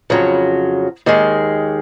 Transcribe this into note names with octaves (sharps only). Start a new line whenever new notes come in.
F2 C#3 F#3
D#2 D#3 G#3